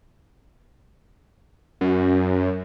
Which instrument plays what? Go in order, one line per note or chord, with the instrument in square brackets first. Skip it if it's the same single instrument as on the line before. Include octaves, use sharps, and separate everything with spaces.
[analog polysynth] F#2